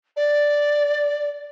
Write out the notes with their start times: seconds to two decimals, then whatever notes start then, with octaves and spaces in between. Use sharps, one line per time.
0.16 D5